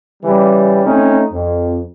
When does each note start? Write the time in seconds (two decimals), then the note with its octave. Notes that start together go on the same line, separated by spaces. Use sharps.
0.23 C#3 E3 G3
0.84 A3 C4 C#4 D#4
1.31 F2